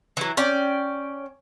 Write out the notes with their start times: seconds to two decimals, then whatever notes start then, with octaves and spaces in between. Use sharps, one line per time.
0.17 E3 F#3
0.37 C#4 D5 G5